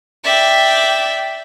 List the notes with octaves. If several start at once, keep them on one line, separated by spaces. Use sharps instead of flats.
D5 E5 G5